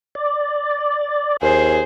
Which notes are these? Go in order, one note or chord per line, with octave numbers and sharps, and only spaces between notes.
D5
D#2 G#4 C5